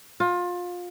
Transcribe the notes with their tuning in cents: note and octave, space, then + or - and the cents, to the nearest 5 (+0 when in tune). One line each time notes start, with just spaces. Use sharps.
F4 +25